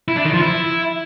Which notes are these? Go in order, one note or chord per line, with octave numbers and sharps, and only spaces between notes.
E4
D4
D#3
F3
E4